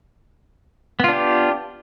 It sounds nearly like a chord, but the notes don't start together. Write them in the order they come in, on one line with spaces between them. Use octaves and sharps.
B3 F4 D4 G4